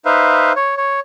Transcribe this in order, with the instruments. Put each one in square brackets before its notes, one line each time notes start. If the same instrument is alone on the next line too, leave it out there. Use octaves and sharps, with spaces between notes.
[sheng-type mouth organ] D#4 B4 C5 E5 F5
C#5
C#5